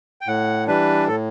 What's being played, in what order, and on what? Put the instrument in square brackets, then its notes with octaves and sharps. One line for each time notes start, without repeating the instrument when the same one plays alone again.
[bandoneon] G5
A2 F#5
E3 G3 D4 B4
A2 A4